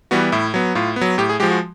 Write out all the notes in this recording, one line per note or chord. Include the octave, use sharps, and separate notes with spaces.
E3 G3 B3 F#4
A2 E4
F#3 B3
A2 F4
B3
F#3
A2 G4
G#4
F3 G#3 G4
F#4